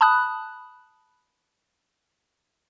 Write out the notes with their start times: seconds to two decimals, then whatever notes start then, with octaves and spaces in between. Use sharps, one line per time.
0.01 A5 B5 D#6 F#6